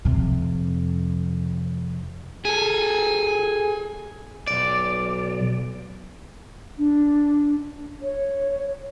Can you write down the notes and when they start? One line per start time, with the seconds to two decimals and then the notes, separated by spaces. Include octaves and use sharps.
0.05 F2 C3
2.45 G#4 A4 G#5
4.48 B1 D5
6.78 D4
8.02 C#5